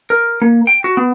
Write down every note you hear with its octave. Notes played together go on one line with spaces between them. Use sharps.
A#4
A#3
G5
F#4
B3